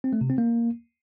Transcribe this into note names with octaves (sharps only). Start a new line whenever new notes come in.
C4
A3
C3
C4
A#3